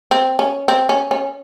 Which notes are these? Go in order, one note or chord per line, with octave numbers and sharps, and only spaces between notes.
C4
C#4
C4
C#4
C#4